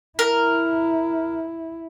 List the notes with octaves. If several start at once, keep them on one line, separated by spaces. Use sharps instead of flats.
E4 A#4